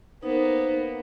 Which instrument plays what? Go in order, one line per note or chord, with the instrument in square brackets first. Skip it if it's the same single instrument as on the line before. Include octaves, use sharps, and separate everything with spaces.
[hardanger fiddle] A#3 B3 [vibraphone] D#4 C5